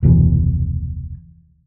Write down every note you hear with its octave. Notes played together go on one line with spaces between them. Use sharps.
F1 D2 B2 E3